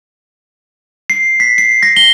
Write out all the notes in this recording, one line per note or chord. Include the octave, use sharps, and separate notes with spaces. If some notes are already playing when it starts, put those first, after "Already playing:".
C7
B6
C7
A#6
G7